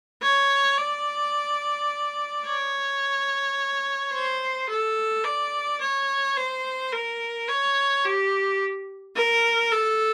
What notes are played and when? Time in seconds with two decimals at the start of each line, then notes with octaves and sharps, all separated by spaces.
0.22 C#5
0.78 D5
2.46 C#5
4.13 C5
4.69 A4
5.24 D5
5.81 C#5
6.37 C5
6.92 A#4
7.48 C#5
8.05 G4
9.16 A#4
9.72 A4